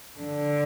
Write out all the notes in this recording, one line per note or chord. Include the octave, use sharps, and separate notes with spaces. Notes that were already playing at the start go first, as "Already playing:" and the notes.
D3